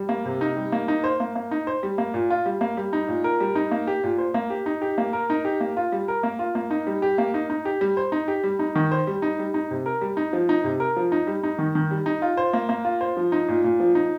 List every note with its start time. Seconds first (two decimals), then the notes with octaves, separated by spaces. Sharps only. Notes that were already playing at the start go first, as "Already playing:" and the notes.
Already playing: G3
0.09 A#3
0.25 C3
0.41 D#4
0.56 G3
0.72 A#3
0.88 D#4
1.04 C5
1.20 A#3
1.35 A#3
1.51 D#4
1.67 C5
1.83 G3
1.98 A#3
2.14 A#2
2.30 F4
2.46 G3
2.61 A#3
2.77 G3
2.93 D#4
3.08 A#2
3.24 A#4
3.40 G3
3.55 D#4
3.71 A#3
3.87 G4
4.04 A#2
4.18 C5
4.34 A#3
4.50 G4
4.66 D#4
4.82 G4
4.98 A#3
5.13 A#4
5.30 D#4
5.45 G4
5.60 A#3
5.77 F4
5.92 G3
6.08 A#4
6.23 A#3
6.39 F4
6.55 A#3
6.71 D#4
6.87 G3
7.02 G4
7.18 A#3
7.34 D#4
7.50 D#4
7.65 G4
7.81 G3
7.97 C5
8.12 D#4
8.28 G4
8.44 G3
8.59 D#4
8.76 D#3
8.92 C5
9.07 G3
9.22 D#4
9.39 G3
9.54 D#4
9.71 C3
9.86 A#4
10.01 G3
10.17 D#4
10.33 F3
10.49 D#4
10.64 C3
10.80 A#4
10.96 F3
11.12 D#4
11.27 G3
11.43 D#4
11.59 D#3
11.75 D#3
11.91 G3
12.06 D#4
12.22 F4
12.37 C5
12.53 A#3
12.69 A#3
12.85 F4
13.01 C5
13.17 F3
13.32 D#4
13.48 A#2
13.64 A#2
13.80 F3
13.95 D#4